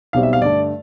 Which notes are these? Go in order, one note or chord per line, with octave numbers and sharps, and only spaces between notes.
B1 B2 G3 C4 F5
E5
F5
G2 D3 A3 D5